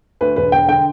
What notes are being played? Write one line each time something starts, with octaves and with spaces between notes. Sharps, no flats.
D2 B4
E1 B4
E1 G5
D3 G5